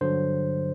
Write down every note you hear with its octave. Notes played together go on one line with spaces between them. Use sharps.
G2 D3 F#3 C5